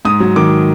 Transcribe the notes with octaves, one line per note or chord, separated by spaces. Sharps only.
G#2 D#6
F#3
D#3 D6